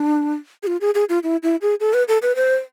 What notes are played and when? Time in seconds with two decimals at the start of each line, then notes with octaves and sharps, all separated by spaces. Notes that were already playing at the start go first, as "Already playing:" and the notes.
Already playing: D4
0.63 G#4
0.67 F4
0.81 G#4
0.95 G#4
1.09 F4
1.23 E4
1.43 E4
1.62 G#4
1.80 A4
1.94 B4
2.08 A4
2.22 B4
2.36 C5